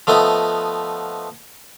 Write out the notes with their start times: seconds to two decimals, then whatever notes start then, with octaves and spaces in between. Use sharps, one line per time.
0.07 F3 A3 B3 D#5